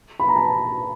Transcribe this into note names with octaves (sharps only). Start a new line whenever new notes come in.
B5
A#5
A5